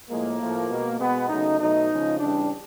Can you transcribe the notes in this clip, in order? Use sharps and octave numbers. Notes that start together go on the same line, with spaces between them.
A2 F3 G#3 A#3
A2 F3 A3
B2 G#3
B2 G#3 B3
C#3 F#3 A3 D#4
B2 F#3 A3 D#4
C#3 F3 G#3
C#3 E3 G3 D4